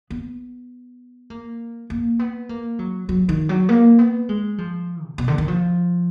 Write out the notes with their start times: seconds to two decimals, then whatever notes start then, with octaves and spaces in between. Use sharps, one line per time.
0.10 B3
1.30 A#3
1.90 A#3
2.19 B3
2.49 A#3
2.79 F#3
3.09 F#3
3.29 D#3
3.49 F#3
3.69 A#3
3.99 B3
4.29 G#3
4.58 F3
5.08 A#2
5.18 B2
5.28 D3
5.38 D#3
5.48 F3